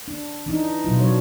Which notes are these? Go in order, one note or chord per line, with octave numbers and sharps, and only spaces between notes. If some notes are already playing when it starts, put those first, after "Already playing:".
D4
E3 D4 D#4
B2 F#3 F4
F#3 D4 C#5